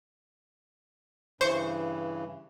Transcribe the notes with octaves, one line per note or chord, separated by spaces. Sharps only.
G2 C#3 E3 C5 C#6